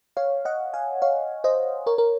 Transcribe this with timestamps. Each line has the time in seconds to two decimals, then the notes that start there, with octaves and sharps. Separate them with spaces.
0.17 C#5 F5
0.45 D#5 F#5
0.73 F5 G#5
1.02 C#5 F5
1.44 C5 D#5
1.87 A#4 C#5
1.98 A#4